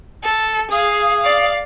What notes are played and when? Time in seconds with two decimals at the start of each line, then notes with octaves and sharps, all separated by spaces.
0.24 A4
0.71 G#4 F5 D#6
1.21 D5 F5